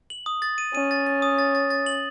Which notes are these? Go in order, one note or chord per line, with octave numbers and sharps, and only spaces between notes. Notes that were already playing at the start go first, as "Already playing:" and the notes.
F#7
D#6
A6
D#7
C#4 D#7
A6
A6
D#6
A6
A6
A6
F#7